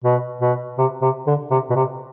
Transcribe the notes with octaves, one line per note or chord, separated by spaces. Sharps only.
B2
B2
C3
C3
D3
C3
B2
C3